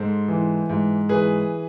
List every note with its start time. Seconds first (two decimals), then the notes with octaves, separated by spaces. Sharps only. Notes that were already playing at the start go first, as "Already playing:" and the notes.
Already playing: G#2 A4 C5
0.28 E3
0.69 G#2
1.09 E3 G#4 B4